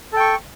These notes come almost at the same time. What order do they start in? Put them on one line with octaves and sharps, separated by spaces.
A4 G5 C#6